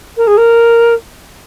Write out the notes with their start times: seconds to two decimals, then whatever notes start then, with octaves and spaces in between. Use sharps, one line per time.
0.17 A#4
0.27 G#4
0.37 A#4